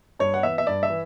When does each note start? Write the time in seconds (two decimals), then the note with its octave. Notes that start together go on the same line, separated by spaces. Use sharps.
0.19 G2 C#5
0.34 F#5
0.43 E3 B3 E5
0.58 E5
0.67 G2 D5
0.83 E5
0.90 E3